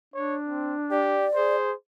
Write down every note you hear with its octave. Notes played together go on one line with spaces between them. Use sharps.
D4 C#5
C4
G4 D5
G#4 C5